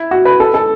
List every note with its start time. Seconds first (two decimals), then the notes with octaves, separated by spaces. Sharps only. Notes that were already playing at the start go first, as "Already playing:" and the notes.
Already playing: E4
0.11 F#4
0.25 B4
0.40 A4
0.54 A4